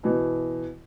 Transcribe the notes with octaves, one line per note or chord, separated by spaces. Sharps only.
B2 E3